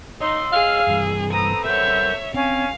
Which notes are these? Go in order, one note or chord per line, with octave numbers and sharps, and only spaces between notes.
D#4 C#5 D#5 C6 E6
G#4 F5
G2 E3
C4 A4 B4 A#5 D#6
A#4 C#5 E5 F#5 G6
C4 C#4 F5